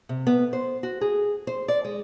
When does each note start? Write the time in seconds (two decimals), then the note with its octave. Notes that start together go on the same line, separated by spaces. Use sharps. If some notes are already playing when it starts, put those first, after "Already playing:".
0.09 C3
0.27 B3
0.53 C5
0.83 F#4
1.01 G#4
1.47 C5
1.68 D5
1.85 G#3